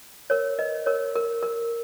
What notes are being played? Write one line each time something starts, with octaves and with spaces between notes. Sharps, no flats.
A#4 C#5
B4 D#5
A#4 C#5
A#4
A#4